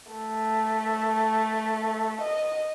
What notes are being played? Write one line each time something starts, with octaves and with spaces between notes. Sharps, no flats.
A3
D#5